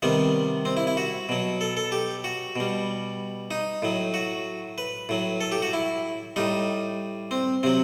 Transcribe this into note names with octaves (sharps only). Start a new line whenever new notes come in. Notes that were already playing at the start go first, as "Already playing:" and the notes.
C3 D#3 G3 B3
C4
E4
E4
F#4
B2 F#3
A4
A4
G4
F#4
B2 G3
D#4
A2 F#3
F#4
B4
A2 F#3
A4
G4
F#4
E4
A2 G3 D#4
C4
C3 F#3 C4